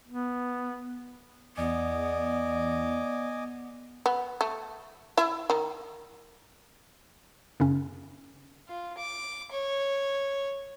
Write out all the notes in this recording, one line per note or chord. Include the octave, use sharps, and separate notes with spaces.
B3
E2 B3 D5 D#5 G#5 D6
B3
A3
E4 E5
D#3
F#2 C#3 C#4
F4
D6
C#5